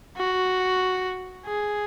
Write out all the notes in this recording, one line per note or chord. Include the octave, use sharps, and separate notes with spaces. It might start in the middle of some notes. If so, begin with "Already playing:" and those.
F#4
G#4